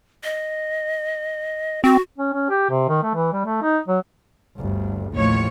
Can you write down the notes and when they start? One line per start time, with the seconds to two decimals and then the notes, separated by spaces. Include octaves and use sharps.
0.24 D#5
1.84 C4 F#4
2.18 C#4
2.33 C#4
2.50 G4
2.70 C3
2.89 D#3
3.03 A3
3.14 E3
3.33 G3
3.45 A3
3.62 D#4
3.88 F#3
4.56 G1 D2
5.13 A1 D#2 A2 F3 C#5